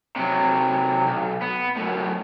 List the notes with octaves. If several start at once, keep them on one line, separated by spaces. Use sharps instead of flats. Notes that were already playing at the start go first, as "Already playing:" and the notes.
C3 F#3
B1
B3
F#2 A2